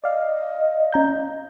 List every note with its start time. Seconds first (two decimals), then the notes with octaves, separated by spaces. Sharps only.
0.04 D5 D#5 F5
0.92 C#4 A#5 G6